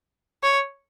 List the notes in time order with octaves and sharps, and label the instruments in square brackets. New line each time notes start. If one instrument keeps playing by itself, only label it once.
[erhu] C#5